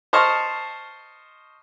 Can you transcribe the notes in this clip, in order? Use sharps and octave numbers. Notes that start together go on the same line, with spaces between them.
C5 D#5 A5 C#6 F6